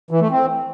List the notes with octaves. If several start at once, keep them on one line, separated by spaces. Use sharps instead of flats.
E3
A3
C4